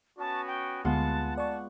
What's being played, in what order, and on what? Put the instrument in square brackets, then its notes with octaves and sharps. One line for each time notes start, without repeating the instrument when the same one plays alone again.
[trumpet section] B3 C#4 F#4 [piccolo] A5
[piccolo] G5
[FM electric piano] D2 [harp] G#3 B3 F4 [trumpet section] F#5 [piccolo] A5
[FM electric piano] D5 C#6 [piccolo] A5